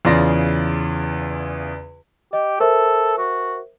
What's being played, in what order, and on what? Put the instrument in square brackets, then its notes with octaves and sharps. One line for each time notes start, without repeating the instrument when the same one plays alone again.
[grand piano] E2 C#3 F4 D5 C6 A#6
[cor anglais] G4 [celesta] D#5
[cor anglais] A4 [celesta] A#4 C5 E5
[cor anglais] F#4